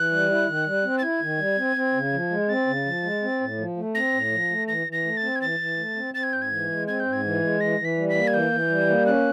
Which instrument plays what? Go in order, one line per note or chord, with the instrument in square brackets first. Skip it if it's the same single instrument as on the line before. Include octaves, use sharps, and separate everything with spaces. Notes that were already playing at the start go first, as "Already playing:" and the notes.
Already playing: [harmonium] E3 [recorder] F#6
[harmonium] G3
E4
D#3
G3
C4
[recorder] A6
[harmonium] E4 [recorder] G#6
[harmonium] D#3
G3
C4
C4
C#3
F3
G#3
[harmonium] C4 [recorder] A6
[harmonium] C#3
F3
G#3
C4
A2
F3
A3
[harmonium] C4 [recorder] A#6
[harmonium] A2
F3
A3
[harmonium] E3 [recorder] A#6
[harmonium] E3
[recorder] A#6
[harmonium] A3
[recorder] A6
[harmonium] C4
[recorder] G#6
[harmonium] E3 [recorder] A6
[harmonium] E3
A3
C4
[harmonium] C4 [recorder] A6
[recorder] G#6
[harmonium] G#2 [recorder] G6
[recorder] G#6
[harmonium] E3
G#3
[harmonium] C4 [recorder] G#6
[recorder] G6
[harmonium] G#2
[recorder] G#6
[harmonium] E3
G#3
[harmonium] E3 [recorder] A#6
[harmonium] E3
[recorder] B6
[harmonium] G3
[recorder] B6
[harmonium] A#3
[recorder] G#6
[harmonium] E3 [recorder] G6
[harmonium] E3
G3
A#3
[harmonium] C#4 [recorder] F#6